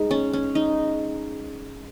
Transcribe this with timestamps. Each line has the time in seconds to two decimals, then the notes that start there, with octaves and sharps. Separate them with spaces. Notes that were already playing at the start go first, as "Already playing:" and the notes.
Already playing: G#3 D#4
0.11 C#4
0.33 C#4
0.55 D#4